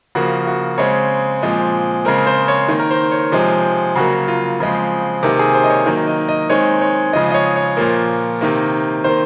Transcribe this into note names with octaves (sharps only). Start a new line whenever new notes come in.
C#3 F3 A#3 F#4
F#4
C#3 G#3 C4 C#5
A#2 F3 G#3 C4
C#3 G#3 C4 A#4
C5
C#5
D#3 A#3
A#4
C5
C#5
C3 F3 G#3 C4
C#3 F#3 A#3 F#4
F4
C#3 F3 G#3 C4
C3 D#3 A#3
G#4
C5
D#5
C#5
D#3 F#3 A#3
D#5
D#5
D#3 G#3 C4 C#5
C#5
C#3 F3 G#3 D#5
D#5
C#5
C#5
A#2 F3 A#3
C3 D#3 A#3
D#3 A#3 C5